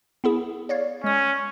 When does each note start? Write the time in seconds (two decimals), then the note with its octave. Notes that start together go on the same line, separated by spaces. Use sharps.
0.24 B3 E4 G#4
0.69 C#5 D5 F5
1.04 G#3 C#4 D#6